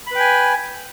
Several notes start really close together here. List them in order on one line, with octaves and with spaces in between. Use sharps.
B5 B4 G5 G#5